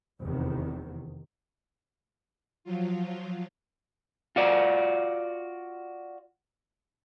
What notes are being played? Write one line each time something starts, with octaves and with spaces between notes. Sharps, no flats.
F1 E2 C3 D#3
F3 F#3 F4
F4 F#4 D5